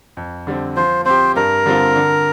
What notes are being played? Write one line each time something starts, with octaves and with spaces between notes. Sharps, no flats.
F2
D3 G3 C4
F3 C5
C4 G4 C5
G2 A#4
D3 G3 C4 F4
D3